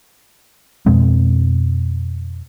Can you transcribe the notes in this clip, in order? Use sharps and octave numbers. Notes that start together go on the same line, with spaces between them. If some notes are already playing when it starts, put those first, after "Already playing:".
F2 B2 G#3 C4